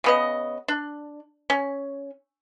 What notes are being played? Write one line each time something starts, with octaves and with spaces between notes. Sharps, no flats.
C#3 B3 D#5
D4
C#4